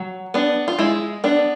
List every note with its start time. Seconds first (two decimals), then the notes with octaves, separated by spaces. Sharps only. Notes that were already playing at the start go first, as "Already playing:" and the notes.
Already playing: F#3
0.34 B3 D4
0.68 F4
0.78 G#3 E4
1.24 B3 D4